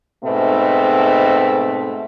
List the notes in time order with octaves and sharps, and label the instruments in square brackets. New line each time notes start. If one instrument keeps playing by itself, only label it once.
[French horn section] G#2 B2 A3 C4